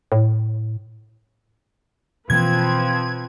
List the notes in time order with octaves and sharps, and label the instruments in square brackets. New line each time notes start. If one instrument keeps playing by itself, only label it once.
[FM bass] A2
[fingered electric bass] B2 E3 A#3 [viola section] F3 C4 B4 [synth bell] G#6